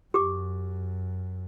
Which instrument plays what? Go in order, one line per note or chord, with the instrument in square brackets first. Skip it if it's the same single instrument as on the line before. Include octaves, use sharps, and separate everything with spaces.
[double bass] F#2 [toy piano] G4 D6